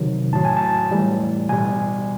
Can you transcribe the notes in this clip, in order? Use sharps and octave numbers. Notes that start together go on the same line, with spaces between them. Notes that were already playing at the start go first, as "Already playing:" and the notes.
Already playing: C3 D#3 F#3
A2 F#3 A5
G#5
A5
A2 E3 G3
B2 G3 G#5